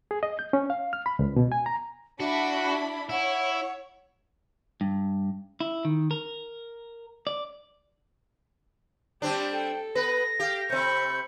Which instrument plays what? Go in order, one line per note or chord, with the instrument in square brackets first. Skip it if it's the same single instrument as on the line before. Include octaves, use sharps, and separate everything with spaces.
[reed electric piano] G#4
D#5
G6
C#4
F5
F6
B5
C#2
B2
G#5
A#5
[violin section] D4 E4 B5 [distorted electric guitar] F#4 [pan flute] E5
[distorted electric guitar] E4 [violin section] C#5 [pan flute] F#5
[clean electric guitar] G2
E4
D#3
A#4
D5
[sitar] G3 C4 D4 [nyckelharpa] G4
[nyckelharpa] A4 [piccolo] G5
[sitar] B3 B4 [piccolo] A#6
[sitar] G4 [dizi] F5
[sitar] C3 C4 [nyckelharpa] B5 C#6 [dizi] G6